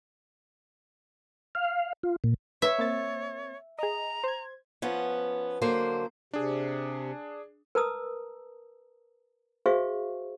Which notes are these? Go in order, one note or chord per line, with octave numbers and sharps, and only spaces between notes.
F5
F4
A#2
B4 C#5 E5
A#3 C4 A6
G#4 D#5 A#5
C5 G#6
F3 B3 C#4
D3 F#3 A#3 C5
C3 D4 G#4
A#4 B4 A5 A#5 D#6 E6
F#4 G#4 C5 E5 F5 C#6